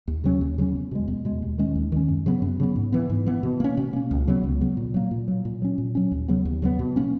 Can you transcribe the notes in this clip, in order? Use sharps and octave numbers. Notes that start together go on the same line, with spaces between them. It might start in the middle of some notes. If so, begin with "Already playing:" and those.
D#2
C#3 F#3 C#4
D#2
C#3 F#3 C#4
E2
B2 G#3
E2
B2 G#3
D#2
D#3 G#3 C#4
D#2
D#3 G#3 C#4
F#2
C#3 F#3 B3
F#2
C#3 F#3 B3
G#2
E3 B3
G#2
E3 B3
B2
A#3 C#4
B2
A#3 C#4
C#2
C#3 F#3 B3
C#2
C#3 F#3 B3
A#2
F#3 A#3
A#2
F#3 A#3
A#2
F#3 C#4
A#2
F#3 C#4
D#2
C#3 F#3 B3
D#2
C#3 F#3 B3
B2
A#3 C#4